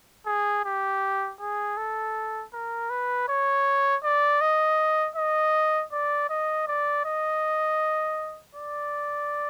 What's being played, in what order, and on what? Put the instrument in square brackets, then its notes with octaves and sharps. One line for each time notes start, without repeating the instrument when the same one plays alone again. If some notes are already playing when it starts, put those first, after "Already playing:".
[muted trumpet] G#4
G4
G#4
A4
A#4
B4
C#5
D5
D#5
D#5
D5
D#5
D5
D#5
D5